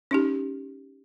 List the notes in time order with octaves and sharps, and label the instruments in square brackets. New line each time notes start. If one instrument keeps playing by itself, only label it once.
[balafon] C#4 D#4 G4